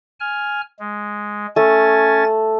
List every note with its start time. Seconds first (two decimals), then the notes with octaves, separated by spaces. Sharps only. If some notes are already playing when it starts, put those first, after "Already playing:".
0.20 G#5 F6
0.79 G#3
1.56 A3 C#4 G#5 A6